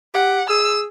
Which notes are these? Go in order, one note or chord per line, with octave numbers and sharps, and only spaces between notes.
G4 F#5
G#4 E6